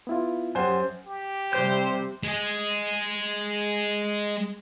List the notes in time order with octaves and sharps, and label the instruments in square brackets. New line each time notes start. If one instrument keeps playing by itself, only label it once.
[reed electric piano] B3 E4 F4
[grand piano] F#2 C5 [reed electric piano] G4 F#5 G#5
[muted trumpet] G4
[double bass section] C3 G3 [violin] C5 [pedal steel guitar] G6
[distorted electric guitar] G#3 G#4